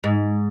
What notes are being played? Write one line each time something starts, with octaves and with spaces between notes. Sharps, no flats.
G#2